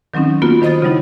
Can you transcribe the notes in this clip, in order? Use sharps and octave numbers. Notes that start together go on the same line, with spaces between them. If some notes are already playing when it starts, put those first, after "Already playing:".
D#3 F#3 C4 C#4 D#4
A#3 B3 F4 F#4
D#3 C5 D#5 B5 D#6 A6
C#3 F#3 G3 D#4 E4